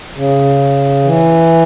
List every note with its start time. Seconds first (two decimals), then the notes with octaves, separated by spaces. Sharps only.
0.16 C#3
1.04 E3